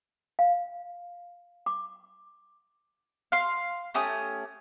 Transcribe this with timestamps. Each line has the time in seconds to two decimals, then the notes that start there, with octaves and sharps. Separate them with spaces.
0.39 F5
1.66 D6
3.32 F5 C6
3.94 A3 C#4 G4 D#6